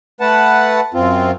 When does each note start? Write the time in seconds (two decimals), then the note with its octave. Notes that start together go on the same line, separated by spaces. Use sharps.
0.21 A3 B4 F#5 A5
0.94 F#2 C4 F4